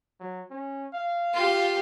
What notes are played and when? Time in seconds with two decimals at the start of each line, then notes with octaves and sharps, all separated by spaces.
0.20 F#3
0.50 C#4
0.94 F5
1.34 F4 G4